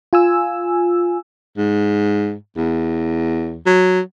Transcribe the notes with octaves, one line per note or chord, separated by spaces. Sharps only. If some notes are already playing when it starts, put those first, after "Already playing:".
F4 G#5 E6
G#2
E2
F#3